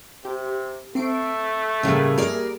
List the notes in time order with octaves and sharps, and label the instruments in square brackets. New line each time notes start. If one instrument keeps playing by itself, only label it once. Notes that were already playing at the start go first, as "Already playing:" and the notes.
[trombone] C3 [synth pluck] G4
[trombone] A3 [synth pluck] C4 C7 D7
[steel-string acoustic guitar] A2 C#3 [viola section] G3 A#3 G#4 [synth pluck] E5 A#5
[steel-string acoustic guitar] A#4 D5